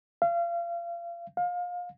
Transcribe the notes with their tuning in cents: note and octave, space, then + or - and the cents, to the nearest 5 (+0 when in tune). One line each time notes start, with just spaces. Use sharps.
F5 -35
F5 +25